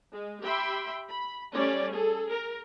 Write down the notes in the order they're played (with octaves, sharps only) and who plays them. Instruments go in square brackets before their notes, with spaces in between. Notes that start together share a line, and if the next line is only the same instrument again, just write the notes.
[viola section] G#3
G4 E5 G5 B5 C6
B5
G3 A3 C#4 C#5 D5
G#4 A4
A#4